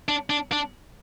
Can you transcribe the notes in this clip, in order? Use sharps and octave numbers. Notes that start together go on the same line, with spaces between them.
D4
D4
D4